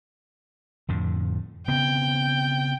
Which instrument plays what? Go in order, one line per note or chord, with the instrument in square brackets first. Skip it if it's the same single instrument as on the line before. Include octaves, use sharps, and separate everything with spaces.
[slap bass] F2 A2 D3
[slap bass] C#3 B3 C4 [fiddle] G5